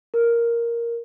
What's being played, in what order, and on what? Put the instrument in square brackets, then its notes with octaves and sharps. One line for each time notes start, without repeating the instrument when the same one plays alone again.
[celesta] A#4